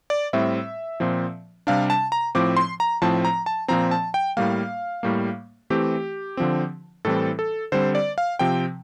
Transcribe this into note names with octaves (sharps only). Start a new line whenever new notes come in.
D5
A2 G3 C4 E5
A#2 F3 C4
C3 G3 D4 F5
A5
A#5
A2 F3 C4 D6
C6
A#5
A2 F3 C4 A5
A#5
A5
A#2 F3 C4 A#5
A5
G5
A2 G3 A#3 F5
A2 G3 A#3
E3 A3 C4 G4
D3 F3 C4
A2 E3 G3 C4 A4
A4
D3 G3 C4 C5
D5
F5
C3 F3 C4 G5